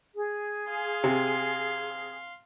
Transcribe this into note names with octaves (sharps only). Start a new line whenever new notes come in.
G#4
F5 C6
C3